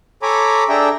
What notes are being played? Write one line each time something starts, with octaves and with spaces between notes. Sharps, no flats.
A4 C#5 G#5 A#5 B5 D6
D4 G#4 A4 E5 G5 A#5